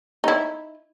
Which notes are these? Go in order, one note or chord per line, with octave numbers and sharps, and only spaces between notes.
D#4 E4